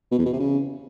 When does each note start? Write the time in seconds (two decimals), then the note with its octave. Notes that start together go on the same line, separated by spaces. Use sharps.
0.11 B2
0.19 E2
0.26 B2
0.33 C3
0.40 C#3